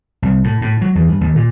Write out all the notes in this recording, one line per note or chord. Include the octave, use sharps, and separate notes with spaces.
C2
A2
A2
F#3
E2
G2
D#2
A#2